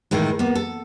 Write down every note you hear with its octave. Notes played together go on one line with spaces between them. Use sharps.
A2 D#3 E3 G#3
A#3 B3
A4